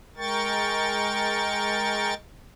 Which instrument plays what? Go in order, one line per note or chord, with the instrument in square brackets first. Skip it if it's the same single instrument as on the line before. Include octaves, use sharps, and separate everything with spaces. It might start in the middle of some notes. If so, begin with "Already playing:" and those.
[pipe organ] G#3 A#4 G5 C#6 A6